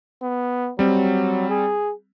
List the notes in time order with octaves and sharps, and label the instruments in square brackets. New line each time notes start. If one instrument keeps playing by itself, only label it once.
[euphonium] B3
[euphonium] F#3 [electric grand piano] G3 C4
[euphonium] G#4